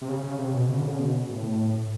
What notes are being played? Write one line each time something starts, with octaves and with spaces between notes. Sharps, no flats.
C3
C#3
C#3
C3
B2
C#3
D3
C#3
B2
A2